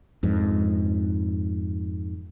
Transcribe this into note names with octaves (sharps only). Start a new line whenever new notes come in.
F2 G#2